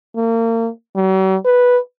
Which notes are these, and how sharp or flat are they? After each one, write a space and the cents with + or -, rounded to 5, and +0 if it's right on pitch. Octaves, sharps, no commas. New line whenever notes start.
A#3 -35
F#3 +45
B4 -5